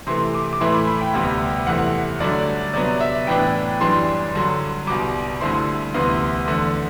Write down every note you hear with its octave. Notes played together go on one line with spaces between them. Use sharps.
C3 E3 A3 C6
D6
D6
A2 E3 A3 E4 C6
B5
B5
G5
D2 C3 G3 B3
E2 C3 E3 A3 F#5
G2 D3 F#3 A3 D4 D5
C3 F#3 B3 D5
E5
A2 E3 B3 D4 G5
F#2 E3 G3 D4 C6
G2 D3 F#3
C2 B2 G3 D6
G2 D3 A3 C4 E4 C6
D2 C3 E3 B3 C6
E2 D3 A3